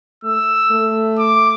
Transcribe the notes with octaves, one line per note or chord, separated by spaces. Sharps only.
A3 E6
A3
D6